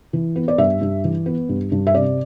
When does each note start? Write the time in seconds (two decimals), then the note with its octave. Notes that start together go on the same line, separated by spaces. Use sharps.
0.13 E3
0.36 B3
0.48 D5
0.58 G2 E5
0.81 G2
1.04 E3
1.26 B3
1.49 G2
1.72 G2
1.87 E5
1.94 C3 D5